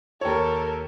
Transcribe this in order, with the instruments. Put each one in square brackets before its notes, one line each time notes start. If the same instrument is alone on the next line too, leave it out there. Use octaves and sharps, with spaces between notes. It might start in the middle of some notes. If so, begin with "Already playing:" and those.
[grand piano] D#2 C#5 [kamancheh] A4 A#4